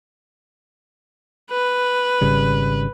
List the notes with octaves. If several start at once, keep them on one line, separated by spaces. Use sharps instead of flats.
B4
G#1 C#3 G3